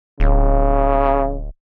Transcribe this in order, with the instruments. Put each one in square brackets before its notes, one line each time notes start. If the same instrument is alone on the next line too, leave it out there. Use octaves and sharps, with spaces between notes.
[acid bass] D1 [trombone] C#3